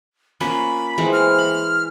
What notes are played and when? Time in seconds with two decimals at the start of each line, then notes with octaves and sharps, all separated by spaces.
0.41 A#3 C#4 F4 B5
0.98 E3 G#3 C4
1.13 F6
1.38 B5